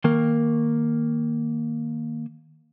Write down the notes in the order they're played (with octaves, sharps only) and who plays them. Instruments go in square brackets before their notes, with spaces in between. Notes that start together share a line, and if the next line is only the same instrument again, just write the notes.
[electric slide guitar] D#3 A#3 A#4